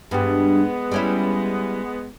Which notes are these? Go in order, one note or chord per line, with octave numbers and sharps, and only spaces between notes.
G2 G3 G#3 B3
G3 C#4 E4